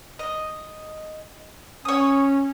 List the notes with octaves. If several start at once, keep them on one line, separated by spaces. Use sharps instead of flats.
D#5
C#4 C#5 D#6